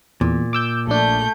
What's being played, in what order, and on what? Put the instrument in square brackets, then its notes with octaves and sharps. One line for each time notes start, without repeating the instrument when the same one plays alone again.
[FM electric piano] E2 [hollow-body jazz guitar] A#2
[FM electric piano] D6 E6 G6
[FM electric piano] A#1 D4 [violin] A3 G6